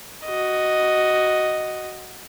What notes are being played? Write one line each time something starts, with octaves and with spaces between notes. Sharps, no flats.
F#4 D#5